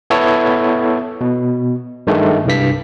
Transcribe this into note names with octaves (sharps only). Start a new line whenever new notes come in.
B3 E4 A4 C#5
B2
G2 D#3 G#3 A3
C2 G2 B6